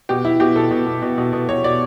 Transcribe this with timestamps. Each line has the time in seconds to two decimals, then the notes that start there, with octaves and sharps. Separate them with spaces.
0.09 B2 G4
0.24 B2 E4
0.40 B2 G4
0.56 B2 A4
0.71 B2
0.86 B2
1.02 B2
1.18 B2
1.33 B2
1.49 B2 C#5
1.64 B2 D5